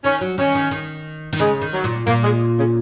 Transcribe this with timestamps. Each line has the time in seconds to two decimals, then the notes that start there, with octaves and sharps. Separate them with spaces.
0.04 D#3 C#4
0.21 F#3
0.38 D#3 C#4
0.55 D#3
0.71 D#3
1.33 D#3
1.39 C#3 G#3
1.62 D#3
1.73 F#3
1.84 A#2
2.07 A#2 A#3
2.23 G#3
2.57 C#3